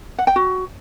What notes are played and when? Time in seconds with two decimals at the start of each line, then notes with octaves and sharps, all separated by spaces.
0.19 F#5
0.27 G5
0.36 F#4